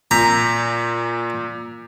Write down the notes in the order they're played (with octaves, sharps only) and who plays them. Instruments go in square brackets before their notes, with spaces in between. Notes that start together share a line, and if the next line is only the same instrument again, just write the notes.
[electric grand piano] A#2 G6 B6 [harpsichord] A#5